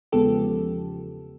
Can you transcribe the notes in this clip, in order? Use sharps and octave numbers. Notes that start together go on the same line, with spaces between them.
E2 C#3 F3 G#3 B3 G4 A4